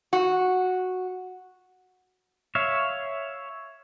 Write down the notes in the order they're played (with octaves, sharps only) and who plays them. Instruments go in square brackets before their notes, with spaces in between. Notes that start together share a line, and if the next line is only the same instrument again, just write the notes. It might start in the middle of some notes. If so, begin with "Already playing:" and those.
[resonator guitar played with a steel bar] F#4
[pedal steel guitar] C#5 E5 F5